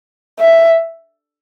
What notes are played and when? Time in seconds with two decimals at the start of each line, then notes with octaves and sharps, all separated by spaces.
0.40 E5